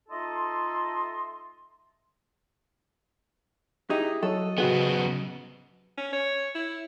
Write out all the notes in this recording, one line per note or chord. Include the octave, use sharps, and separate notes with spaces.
A3 D#4 F4 A4 D#5 C6
D#4 E4 G4 G#4
F#3 A4 D#5
C#3 B3 F#4 G#4
C#4
C#5
E4